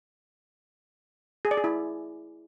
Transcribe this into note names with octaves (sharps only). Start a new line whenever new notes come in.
G#4
D5
G#4
E4